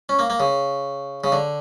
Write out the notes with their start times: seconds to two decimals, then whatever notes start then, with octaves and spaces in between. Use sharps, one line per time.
0.09 C#4
0.19 A#3
0.30 A#3
0.40 C#3
1.24 C#3
1.32 D3